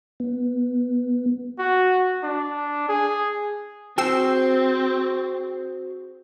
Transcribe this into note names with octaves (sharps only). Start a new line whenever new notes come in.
B3
F#4
D4
G#4
C4 F#4 G#4 C5 G5 E6 C7